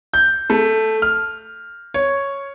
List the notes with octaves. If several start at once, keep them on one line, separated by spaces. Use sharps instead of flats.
G6
A3
F6
C#5